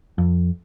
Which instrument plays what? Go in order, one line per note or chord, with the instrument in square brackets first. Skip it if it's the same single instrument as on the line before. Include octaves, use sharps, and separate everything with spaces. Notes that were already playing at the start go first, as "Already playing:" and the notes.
[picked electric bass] F2